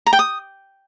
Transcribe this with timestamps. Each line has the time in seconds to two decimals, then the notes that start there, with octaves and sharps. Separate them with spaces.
0.07 A#5
0.13 G5
0.19 D#6